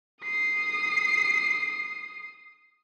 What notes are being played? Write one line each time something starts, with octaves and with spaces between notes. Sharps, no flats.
D#6 C7